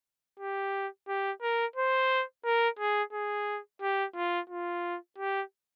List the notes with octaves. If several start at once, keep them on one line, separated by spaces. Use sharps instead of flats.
G4
G4
A#4
C5
A#4
G#4
G#4
G4
F4
F4
G4